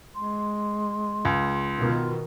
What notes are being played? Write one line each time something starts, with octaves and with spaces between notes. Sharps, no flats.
G#3 C6
C#2
B2 D#3 F4